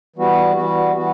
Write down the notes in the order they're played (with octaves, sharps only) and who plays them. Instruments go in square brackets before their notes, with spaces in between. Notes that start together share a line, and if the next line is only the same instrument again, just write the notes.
[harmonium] E3 G3 B3 F#4
E3 G3 B3 F#4
E3 G3 B3 F#4